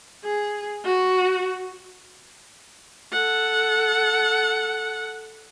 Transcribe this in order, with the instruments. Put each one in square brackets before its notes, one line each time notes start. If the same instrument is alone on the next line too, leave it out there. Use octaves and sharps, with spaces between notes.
[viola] G#4
F#4
A4 F#5